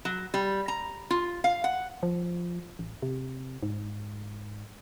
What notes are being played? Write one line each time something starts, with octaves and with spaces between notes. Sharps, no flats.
F#3
G3
A#5
F4
F5
F#5
F3
A1
C3
G#2